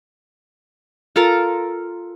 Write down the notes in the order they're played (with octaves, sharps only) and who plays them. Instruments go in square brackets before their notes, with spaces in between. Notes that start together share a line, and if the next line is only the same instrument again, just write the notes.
[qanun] F4 A4 A#4 A#5